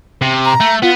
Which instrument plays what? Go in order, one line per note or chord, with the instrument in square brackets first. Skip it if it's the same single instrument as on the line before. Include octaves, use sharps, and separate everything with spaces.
[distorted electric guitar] C3
[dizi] A#5
[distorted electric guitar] A3
[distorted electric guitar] B3 [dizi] F4